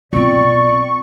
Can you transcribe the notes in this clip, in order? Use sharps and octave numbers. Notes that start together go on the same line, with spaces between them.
B1 C4 F4 D5 C#6